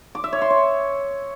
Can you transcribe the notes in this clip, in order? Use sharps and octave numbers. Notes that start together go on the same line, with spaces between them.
D6
E5
C#5
C6
C#5